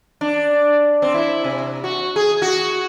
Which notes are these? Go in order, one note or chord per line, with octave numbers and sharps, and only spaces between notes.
D4
C4
E4
C3
F#4
G#4
F#4